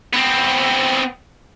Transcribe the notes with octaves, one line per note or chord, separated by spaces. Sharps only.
B3 C4